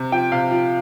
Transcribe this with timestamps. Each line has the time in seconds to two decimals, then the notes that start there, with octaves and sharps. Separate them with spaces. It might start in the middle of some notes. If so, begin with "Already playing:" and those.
Already playing: C3
0.12 F3 G5
0.32 C3 F5
0.51 F3